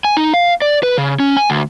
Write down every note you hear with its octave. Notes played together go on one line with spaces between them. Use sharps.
G#5
D#4
F5
D5
B4
C#3
C#4
G#5
D2